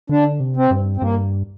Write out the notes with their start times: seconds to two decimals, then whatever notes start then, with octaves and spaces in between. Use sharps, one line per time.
0.09 D3 D4
0.40 C3
0.56 C4
0.71 G2
0.97 C4
1.01 G2 A#3